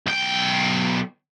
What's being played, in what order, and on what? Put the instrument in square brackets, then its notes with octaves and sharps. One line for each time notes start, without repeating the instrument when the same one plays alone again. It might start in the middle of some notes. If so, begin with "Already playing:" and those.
[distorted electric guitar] B1 G5